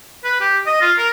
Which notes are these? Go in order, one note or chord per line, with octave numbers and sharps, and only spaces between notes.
B4
G4
D#5
F4
A#4